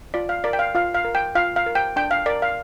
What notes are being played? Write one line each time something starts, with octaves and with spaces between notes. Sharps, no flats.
F4 D5
F5
A#4 D5
G5
F5
F4 F5
F5
A#4
G5
F4 F5
F5
A#4
G5
D4 G5
F5
A#4 D5
F5